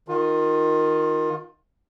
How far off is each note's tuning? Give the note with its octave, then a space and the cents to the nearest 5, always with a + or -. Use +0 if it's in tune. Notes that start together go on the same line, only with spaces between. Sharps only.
D#3 +0 F4 +25